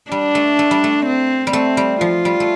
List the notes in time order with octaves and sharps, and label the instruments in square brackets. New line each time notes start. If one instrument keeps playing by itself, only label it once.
[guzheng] G3 [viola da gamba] D4
[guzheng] A3
A3
G3
A3
[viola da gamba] C4
[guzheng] G3
[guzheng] A3 [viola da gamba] C4
[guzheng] G3
[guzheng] F3 [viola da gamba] F4
[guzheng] G3
A3